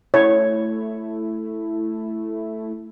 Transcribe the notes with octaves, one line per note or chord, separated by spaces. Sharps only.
A3 E4 C#5